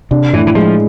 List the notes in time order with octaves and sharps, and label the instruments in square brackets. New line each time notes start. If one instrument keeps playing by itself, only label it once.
[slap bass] C3 [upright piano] D4
[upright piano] A2 [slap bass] E3
[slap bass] E3
[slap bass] F3 [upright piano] G#3